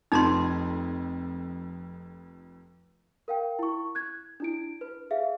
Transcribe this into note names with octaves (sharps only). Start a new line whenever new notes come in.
F1 F2 D#4 A#5 C6 G#6
A#4 F5 G5
E4 C#6
F#6 G#6
D4 E4 D7
B4
G#4 E5 F5